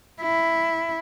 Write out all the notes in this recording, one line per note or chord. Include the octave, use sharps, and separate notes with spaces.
E4